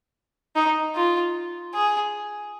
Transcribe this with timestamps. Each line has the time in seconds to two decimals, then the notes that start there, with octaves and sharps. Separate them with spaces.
0.56 D#4
0.96 F4
1.75 G#4